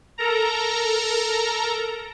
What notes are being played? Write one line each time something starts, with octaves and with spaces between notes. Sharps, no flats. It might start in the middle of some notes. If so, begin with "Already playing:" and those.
A4 A#4 A#5